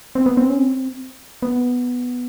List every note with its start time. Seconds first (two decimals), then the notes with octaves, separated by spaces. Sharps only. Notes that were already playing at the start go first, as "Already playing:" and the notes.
0.15 C4
0.26 B3
0.37 C4
0.49 C#4
0.58 C4
1.42 B3